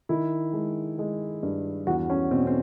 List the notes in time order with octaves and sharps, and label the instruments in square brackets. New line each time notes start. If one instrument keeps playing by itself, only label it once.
[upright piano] D#3 E4
G#3
G#3
G2
E2 F#4
C#4
B2 C4
C4